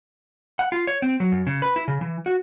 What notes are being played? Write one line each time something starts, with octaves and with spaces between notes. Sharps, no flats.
F#5
F4
C#5
C4
F#3
F#2
C#3
B4
E4
C#3
E3
F#4